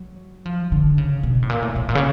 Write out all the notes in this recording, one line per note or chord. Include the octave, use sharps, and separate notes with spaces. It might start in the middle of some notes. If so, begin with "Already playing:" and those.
Already playing: F#3
F3
D3
C#3
B2
A2
A#2
A2
A2
A#2
C#3